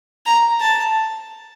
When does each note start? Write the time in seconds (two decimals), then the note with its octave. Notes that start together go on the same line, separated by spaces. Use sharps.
0.26 A#5
0.60 A5